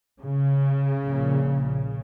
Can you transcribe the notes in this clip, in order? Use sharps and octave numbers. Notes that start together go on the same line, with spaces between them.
C#3
A#1 A#2